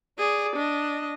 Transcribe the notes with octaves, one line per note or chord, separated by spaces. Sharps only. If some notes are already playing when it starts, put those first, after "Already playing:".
G#4 D5
D4 D#5